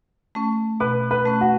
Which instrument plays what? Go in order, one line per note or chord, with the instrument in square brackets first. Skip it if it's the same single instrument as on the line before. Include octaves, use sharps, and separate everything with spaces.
[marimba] A3 C#4
[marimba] B2 [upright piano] B4
[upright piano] B4
[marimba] A3 C#4
[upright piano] F#4